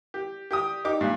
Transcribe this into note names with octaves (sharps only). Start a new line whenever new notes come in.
G4
G4 G5 D#6
D#4 G4 D6
G2 A#2